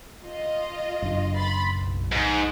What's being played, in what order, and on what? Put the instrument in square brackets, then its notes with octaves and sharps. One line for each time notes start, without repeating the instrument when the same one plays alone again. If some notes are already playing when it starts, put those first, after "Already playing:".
[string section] F4 D#5
[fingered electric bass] F#1 D4
[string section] B5 C6 A6
B1
[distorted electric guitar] G#2